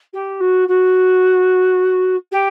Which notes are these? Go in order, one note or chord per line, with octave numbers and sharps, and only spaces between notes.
G4
F#4
F#4
G4